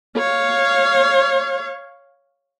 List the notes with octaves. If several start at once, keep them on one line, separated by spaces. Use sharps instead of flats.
C#5 F5